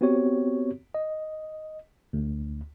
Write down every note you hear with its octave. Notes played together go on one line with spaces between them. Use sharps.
B3 C4 F#4 G4 C#5
D#5
D2